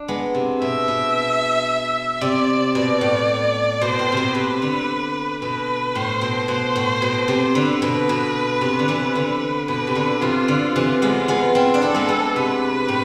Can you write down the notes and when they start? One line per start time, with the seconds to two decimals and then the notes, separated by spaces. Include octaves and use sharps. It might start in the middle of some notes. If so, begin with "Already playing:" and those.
Already playing: D4
0.08 G#3 B3
0.34 C3
0.61 B2 E5
0.88 B2
2.21 C3 D5
2.75 B2 D5
3.01 A2
3.81 B2 C5
3.99 A2
4.12 C3
4.17 B2
4.35 C3 B4
4.62 D3
5.42 B2 B4
5.95 A2 C5
6.21 B2
6.48 B2 C5
6.76 A2
7.02 B2
7.28 C3
7.55 D3 B4
7.82 B2
8.09 B2
8.61 C3
8.79 D3
8.88 C3 E3
9.15 D3
9.68 B2 B4
9.87 C3
9.95 D3
10.21 C3 E3 F4
10.48 D3
10.75 C3 E3 F4
11.02 G#3 B3
11.28 G#3 B3
11.55 C4 E4
11.74 D4
11.82 C4 E4 A4
11.95 G#3 B3
12.08 G#3 B3
12.36 C3 B4
12.88 A2